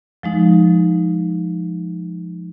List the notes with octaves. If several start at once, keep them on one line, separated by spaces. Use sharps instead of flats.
F3 G#3 D#4